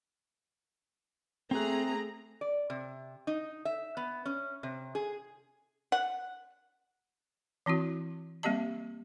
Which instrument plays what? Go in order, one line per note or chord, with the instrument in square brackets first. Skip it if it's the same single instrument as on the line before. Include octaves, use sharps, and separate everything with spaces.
[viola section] A3 G#4 A#5 [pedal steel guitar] C4 F#6
[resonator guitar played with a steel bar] D5
C3
D#4
E5
B3
C#4
C3
G#4
[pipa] F#5
[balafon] E3 C4 E4 F#4
G3 A#3 C4 G4 D#5 A5